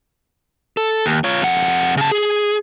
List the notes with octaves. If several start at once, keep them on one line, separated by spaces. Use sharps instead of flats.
A4
D#2
F4 C#5
F2 F#5
C#3 A5
G#4